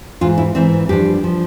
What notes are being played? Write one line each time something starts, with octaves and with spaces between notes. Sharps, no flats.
G#2 E3 F4
E4
G#2 E3 C4
G2 F3 G4
F3